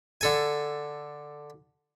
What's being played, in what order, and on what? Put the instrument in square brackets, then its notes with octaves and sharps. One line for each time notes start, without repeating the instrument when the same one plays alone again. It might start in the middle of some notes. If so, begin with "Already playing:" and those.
[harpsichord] D3 A4 G#5